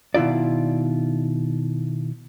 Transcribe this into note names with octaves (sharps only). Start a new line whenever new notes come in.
B2 D#3 E4 F4 D5